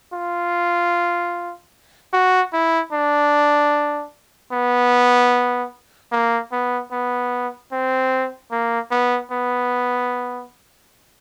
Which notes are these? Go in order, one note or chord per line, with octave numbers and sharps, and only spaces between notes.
F4
F#4
E4
D4
B3
A#3
B3
B3
C4
A#3
B3
B3